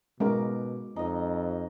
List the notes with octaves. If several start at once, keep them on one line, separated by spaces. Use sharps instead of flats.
B2 G#3 C#4 A#4 D6
F2 D#4 D#5